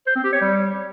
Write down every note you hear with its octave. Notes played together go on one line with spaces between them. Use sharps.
C5
C4
G4
C#5
G3